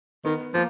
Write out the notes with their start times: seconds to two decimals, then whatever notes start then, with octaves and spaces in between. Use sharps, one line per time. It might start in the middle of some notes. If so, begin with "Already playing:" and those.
0.25 D#3 B3
0.54 F3 A#3